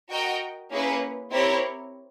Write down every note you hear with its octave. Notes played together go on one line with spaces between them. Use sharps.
F#4 A#4 D#5 G5
A#3 C#4 E4 G#4 B4
C4 E4 G4 A#4 C#5